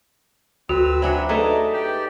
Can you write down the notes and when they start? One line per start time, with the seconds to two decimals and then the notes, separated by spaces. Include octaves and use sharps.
0.69 D2 C4 F#4 B4 E6
1.02 F#3 D4 C5 E5 F#5 G#5
1.29 A3 D#4 G#4 B4 A5 A#5 D6
1.73 G4 D5 G5